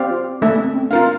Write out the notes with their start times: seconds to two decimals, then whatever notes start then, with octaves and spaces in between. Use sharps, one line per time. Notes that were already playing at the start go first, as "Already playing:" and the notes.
Already playing: C4 G4 D5 F5
0.10 F4
0.41 A3 A#3 D4 A4 E5
0.58 C4
0.74 C4
0.91 D4 F4 A#4 F5